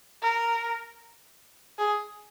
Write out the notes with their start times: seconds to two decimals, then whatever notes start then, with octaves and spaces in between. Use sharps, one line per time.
0.22 A#4
1.78 G#4